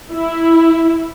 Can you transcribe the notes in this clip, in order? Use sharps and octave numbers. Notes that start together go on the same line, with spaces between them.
E4